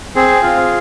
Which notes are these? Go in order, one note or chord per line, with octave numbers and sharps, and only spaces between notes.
C4 G#4
F4